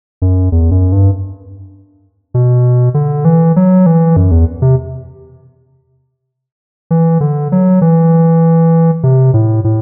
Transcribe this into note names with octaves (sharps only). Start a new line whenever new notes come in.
F#2
E2
F#2
G2
B2
D3
E3
F#3
E3
F#2
E2
C3
E3
D3
F#3
E3
C3
A2
A2